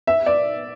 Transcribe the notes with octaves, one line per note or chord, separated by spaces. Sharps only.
E5
D5